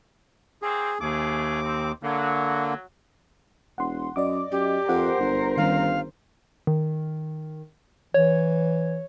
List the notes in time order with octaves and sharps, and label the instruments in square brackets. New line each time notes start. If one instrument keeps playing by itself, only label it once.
[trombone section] F#3 A#3 C4 [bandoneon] G#4
[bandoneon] D#2 D6 [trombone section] B2 A3 G#4
[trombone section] C4 D#4
[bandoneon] D3 A#3 [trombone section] F#3
[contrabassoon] E1 [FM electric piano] F#5 C6
[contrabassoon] F#2 [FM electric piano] D5 D#5 D6
[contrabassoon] F#2 [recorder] G4
[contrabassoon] F2 [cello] A#4 C5 [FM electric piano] F#5
[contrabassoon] G1
[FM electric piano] D#3 G3 C#4 [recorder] F5
[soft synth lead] D#3
[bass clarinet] E3 [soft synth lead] C#5